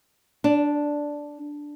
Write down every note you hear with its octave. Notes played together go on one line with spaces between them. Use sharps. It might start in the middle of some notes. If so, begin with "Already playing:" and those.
D4